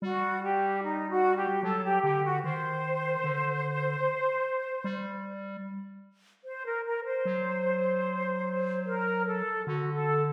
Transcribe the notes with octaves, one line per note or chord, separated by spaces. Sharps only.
G3 F#4
G4
D#4
F#4
G4
F#3 A4
G4
D3 G4
F#4
D#3 C5
D3
G3
C5
A#4
A#4
C5
F#3
A#4
A4
D3 F#4
A4